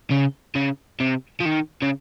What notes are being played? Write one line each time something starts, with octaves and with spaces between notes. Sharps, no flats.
C#3
C#3
C3
F3
D#3
C#3